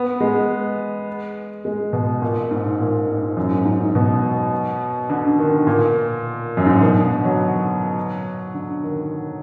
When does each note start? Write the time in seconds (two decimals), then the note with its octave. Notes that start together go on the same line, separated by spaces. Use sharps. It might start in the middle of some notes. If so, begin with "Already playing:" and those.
Already playing: B3
0.21 G#3
1.65 G#3
1.93 B2
2.22 A#2
2.51 G#2
2.80 A#2
3.09 G#2
3.37 F#2
3.51 G#2
3.65 G#2
3.80 G#2
3.95 B2
5.10 D3
5.28 D3
5.39 D#3
5.67 A#2
6.57 F#2
6.66 G#2
6.73 A#2
6.82 B2
6.96 D3
7.25 F#3
8.54 D3
8.83 D#3